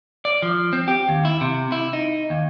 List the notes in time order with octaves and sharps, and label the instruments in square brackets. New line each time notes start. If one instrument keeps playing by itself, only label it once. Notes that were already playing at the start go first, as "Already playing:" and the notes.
[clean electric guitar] D5
F3
C4
G4
D#2
E4
C3
E4
D#4
D#2